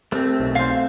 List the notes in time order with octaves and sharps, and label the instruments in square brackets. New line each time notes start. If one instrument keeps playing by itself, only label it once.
[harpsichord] C2 [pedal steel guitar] A3 C4
[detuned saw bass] B1
[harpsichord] C5 G#5 [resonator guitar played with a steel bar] F5